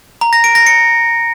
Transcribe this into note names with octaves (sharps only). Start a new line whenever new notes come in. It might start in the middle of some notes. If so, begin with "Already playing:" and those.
A#5
A#6
D7
A#6
C#7